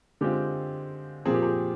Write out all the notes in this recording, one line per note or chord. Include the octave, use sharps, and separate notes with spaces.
D3 G#3 C4 F4 G4
A#2 F3 C4 G#4
G4
G#4